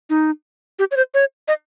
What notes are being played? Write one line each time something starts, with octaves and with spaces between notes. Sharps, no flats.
D#4
G4
C#5
C5
C#5
D#5